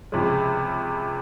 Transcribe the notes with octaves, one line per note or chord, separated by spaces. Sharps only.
C#2 C3 F3 G#3 C#4